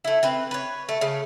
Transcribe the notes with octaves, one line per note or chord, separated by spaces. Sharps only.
A3 E4
C4 B4
B4 C#5
A3
C#3 A3